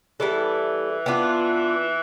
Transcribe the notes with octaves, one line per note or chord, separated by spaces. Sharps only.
E3 G3 B3 E4 A4
B3 D4 F4